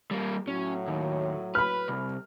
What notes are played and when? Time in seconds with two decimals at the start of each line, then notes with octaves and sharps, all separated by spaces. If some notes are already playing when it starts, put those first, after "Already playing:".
0.11 G3 A#3
0.48 A2 F#3 C#4
0.88 D#2
1.55 B4 B5 F6
1.88 C2